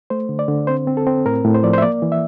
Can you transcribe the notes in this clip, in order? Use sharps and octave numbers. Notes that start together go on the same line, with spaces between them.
A3 C5
D3
D5
D3
C4 C5
C4
A4
C4
A2 A#4
A2
C5
F3 D5
C5
E5
A#3 D5
E3
E5